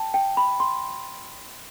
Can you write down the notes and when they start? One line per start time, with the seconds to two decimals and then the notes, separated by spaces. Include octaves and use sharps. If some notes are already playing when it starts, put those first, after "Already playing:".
Already playing: G5 A5
0.14 G5
0.37 B5
0.60 C6